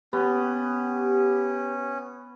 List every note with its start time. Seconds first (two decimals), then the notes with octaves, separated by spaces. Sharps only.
0.13 B3 C#4 G4